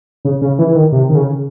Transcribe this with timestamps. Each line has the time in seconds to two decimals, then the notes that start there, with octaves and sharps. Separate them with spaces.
0.25 C#3
0.41 C#3
0.59 E3
0.75 D#3
0.92 C3
1.09 D#3
1.15 C#3